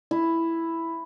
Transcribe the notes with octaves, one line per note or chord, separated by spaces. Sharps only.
E4